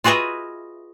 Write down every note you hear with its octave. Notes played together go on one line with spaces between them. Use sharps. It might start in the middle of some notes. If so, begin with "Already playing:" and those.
F4 F#4 G#4 B4 D#5 E5